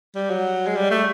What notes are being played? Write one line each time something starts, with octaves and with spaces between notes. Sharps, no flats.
G3
F#3
G#3
G3
A3